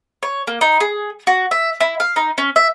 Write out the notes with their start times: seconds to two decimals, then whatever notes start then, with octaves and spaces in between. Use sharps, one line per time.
0.23 C#5
0.47 A#3
0.61 D#4
0.80 G#4
1.27 F#4
1.51 E5
1.81 E4
2.00 F5
2.16 D#4
2.38 C#4
2.56 E5